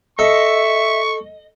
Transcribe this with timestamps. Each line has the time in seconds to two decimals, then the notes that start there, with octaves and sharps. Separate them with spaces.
0.19 A4 D#5 E5 C#6